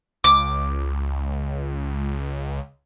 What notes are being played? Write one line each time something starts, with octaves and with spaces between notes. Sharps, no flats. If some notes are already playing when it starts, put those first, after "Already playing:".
C#2 D6